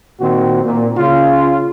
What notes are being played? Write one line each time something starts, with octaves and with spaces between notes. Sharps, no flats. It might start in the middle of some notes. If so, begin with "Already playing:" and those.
A#2 D#3 C4 F#4
A#2
C#3 F4